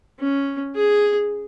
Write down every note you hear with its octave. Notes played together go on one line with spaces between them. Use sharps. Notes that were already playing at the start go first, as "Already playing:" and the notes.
C#4
G#4